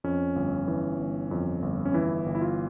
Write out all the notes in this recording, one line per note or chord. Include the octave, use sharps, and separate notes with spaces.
F2 C#4
G1
E3
G1
F2
G1
C#4
E3 E4
G1
E4
F4